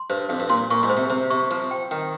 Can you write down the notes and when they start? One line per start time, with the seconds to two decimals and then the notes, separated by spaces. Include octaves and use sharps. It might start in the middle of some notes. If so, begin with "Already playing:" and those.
Already playing: C6
0.10 G2 C5
0.29 F2 F5
0.40 G2
0.50 A#2 C6
0.71 A#2 C#6
0.83 G#2
0.90 C5
0.97 C3
1.10 C3 C5
1.30 C3 C#6
1.50 F3 C5
1.71 G5
1.91 D#3 G5